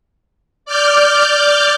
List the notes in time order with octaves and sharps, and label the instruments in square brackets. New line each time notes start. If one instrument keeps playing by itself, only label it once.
[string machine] D5 D6 F6 G6